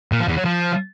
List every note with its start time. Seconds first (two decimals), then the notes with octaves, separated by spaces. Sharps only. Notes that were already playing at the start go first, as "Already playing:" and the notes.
0.12 A#2
0.20 F3
0.28 E2
0.37 F#3
0.45 F3